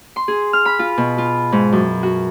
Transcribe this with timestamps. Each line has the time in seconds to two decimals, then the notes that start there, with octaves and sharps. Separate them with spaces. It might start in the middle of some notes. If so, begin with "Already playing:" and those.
0.16 C6
0.28 G#4
0.53 F6
0.65 B5
0.79 F4
0.98 B2
1.18 F4
1.52 G#2
1.73 F#2
2.03 F#4